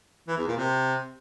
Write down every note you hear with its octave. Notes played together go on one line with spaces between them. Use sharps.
E3
E2
A#2
C3